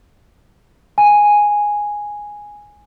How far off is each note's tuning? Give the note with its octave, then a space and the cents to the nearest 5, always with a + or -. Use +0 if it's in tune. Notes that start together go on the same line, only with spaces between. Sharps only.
G#5 -5